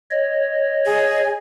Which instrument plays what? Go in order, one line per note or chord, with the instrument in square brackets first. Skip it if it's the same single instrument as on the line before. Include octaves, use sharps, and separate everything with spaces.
[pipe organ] C#5 D#5
[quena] G#4